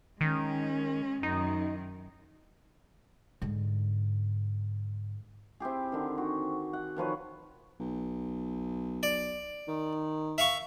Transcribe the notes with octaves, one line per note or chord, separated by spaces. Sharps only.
D#3 G#3 C#4
F#2 D#3 D#4
G#2 D3
C4 E4 G4 G#4
D3 D#3
F#4
C#6
F#5
D#3 F3 B4 C#5
B1
D5
D#3
E5 F5 C#6